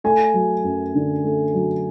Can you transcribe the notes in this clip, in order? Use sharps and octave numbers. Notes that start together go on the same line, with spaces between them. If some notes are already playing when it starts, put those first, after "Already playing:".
A3 G#5
F#3
F#2
D3
A3
F#3